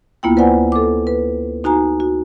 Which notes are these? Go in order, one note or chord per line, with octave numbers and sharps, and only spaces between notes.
D2 A#3 B3 E4 F4 G5
B4 C5 D5 F#5 G#5
A4 D6
B4
D#4 F#4 G#5 A#5
F#4